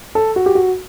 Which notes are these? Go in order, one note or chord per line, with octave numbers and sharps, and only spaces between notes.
A4
F#4
G4
F#4